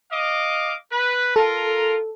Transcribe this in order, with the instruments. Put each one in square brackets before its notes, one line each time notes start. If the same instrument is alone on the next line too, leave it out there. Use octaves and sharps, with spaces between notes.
[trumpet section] D#5 F5 D6
B4
[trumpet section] F4 A#4 [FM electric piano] A4